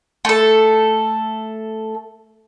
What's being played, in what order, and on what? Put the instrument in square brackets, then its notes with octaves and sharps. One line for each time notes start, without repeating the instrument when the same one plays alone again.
[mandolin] A3 A4